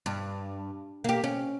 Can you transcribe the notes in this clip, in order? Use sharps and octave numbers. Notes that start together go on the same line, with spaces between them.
G2
A#3 G4
C#4